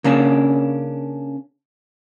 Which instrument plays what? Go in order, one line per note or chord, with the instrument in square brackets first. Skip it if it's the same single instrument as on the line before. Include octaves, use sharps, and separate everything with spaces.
[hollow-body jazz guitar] C#3 A#3 C#4 D4